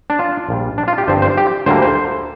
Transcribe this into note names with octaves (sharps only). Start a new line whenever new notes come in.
D4
F4
A#1 A#2 G3
D4
F4
G4
G1 G2 F3 C4 C5
C5
G4
D2 D3 G3 A#3 C5
C5